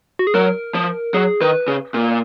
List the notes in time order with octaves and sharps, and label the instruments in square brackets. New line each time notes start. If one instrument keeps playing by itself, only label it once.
[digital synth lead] F#4
G#4
[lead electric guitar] F#3 [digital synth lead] A#4
[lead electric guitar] F3
[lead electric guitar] F#3 [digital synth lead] G#4
[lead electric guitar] D#3 [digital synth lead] B4
[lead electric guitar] C#3
A#2